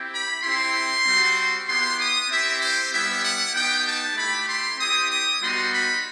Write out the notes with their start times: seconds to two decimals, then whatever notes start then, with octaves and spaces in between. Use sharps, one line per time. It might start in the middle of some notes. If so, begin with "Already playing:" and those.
Already playing: C4 E4 G4
0.11 B5
0.42 C4 E4 G4 C6
1.05 G3 C4 F#4
1.67 B3 E4 G4 C6
1.97 D#6
2.28 C4 E4 G4 E5
2.60 C5
2.91 G3 B3 E4 G4 E5
3.22 F#5
3.53 B3 D#4 G4 G5
3.85 A5
4.15 A3 E4 G4 B5
4.47 C6
4.78 C4 E4 G4 D#6
5.09 D#6
5.40 G3 B3 D#4 F#4 C6
5.71 B5